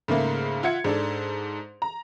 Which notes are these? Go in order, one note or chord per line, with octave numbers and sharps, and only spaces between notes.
G#2 C#3 A3 A#3
F4 E5 F#5 G#6 C#7
G#2 D4 A4
A#5